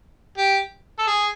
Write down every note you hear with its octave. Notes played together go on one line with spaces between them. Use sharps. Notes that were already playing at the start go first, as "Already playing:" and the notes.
G4
A4
G#4